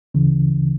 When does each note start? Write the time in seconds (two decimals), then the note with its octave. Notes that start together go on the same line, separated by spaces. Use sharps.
0.14 D2 C#3 E3